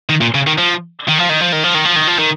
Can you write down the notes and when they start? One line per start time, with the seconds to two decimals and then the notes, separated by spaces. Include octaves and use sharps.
0.09 D#3
0.21 A#2
0.35 C#3
0.47 D#3
0.58 F3
1.08 D#3
1.19 F3
1.29 D#3
1.41 F3
1.52 D#3
1.64 F3
1.74 D#3
1.85 F3
1.96 D#3
2.08 F3
2.19 D#3